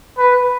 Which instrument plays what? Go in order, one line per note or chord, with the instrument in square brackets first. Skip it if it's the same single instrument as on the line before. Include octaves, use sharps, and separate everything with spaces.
[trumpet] B4